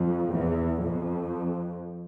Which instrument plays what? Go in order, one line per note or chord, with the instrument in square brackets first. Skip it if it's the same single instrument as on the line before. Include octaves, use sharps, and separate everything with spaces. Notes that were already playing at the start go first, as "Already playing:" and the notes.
Already playing: [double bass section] F2
E2
F2